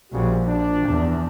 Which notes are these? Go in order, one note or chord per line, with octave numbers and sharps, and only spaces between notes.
A#1 C#3 G3 F#4
D4
E2